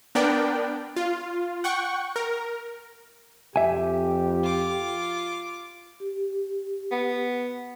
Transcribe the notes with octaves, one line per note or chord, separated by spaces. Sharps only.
B3 D4 A#4 D5 G5
F4
F#5 G5 C#6
A#4
F2 G4 E5 G#5
F4 D6
G4
B3